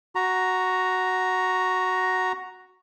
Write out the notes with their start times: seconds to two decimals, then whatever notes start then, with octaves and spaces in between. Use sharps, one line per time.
0.15 F#4 A#5